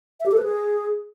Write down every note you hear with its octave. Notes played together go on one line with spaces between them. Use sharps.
E5
G4
A4
B4
G#4